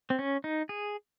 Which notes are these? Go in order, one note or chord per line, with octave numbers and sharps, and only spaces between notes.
C4
C#4
D#4
G#4